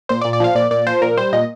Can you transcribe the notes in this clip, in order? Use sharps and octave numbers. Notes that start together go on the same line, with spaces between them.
A#2 C5
D5
A#2
D5
F3 F5
A#2 D5
A#2 D5
F3 C5
A#2 A#4
G3 C5
A#2 D#5